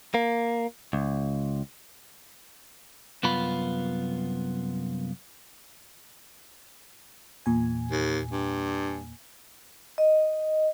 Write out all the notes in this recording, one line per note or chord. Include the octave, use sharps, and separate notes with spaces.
A#3
C#2
C2 F#2 B3 F4 B5
E2 A#2 G#5
D#2
G2
D#5